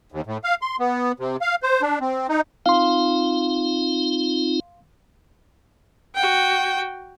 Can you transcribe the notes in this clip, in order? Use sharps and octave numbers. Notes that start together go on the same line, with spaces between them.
D#2
A2
F5
C6
B3
C3
F5
C5
D4
C4
D#4
C4 D#4 F4 F5 C6
F#4 G5